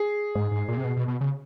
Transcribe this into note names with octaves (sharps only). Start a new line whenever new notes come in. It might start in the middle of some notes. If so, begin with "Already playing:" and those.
Already playing: G#4
G#2
G#2
A#2
C3
B2
B2
B2
C#3